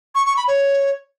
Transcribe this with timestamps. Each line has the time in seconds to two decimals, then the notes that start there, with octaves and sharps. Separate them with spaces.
0.15 C#6
0.26 C#6
0.37 B5
0.48 C#5